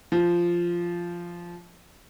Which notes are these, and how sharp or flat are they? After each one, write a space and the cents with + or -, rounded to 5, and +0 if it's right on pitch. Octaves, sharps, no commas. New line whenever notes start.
F3 -10